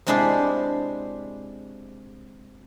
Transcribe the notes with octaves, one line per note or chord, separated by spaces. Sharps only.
C3 G#3 D4 E4 C5 E5